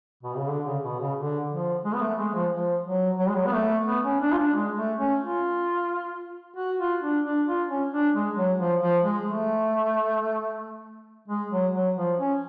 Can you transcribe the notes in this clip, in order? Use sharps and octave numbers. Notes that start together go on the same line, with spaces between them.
B2
C#3
D3
C#3
B2
C#3
D3
F3
G#3
B3
A3
G#3
F3
F3
F#3
F#3
G#3
F#3
B3
A3
B3
C#4
D4
F4
D4
G#3
A3
C#4
F4
F#4
F4
D4
D4
F4
C#4
D4
G#3
F#3
F3
F3
G#3
A3
G#3
F#3
F#3
F3
C#4